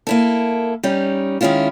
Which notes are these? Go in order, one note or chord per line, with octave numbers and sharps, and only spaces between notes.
A#3 E4 A4
G3 C#4 D#4
D#3 G#3 C#4 E4 F4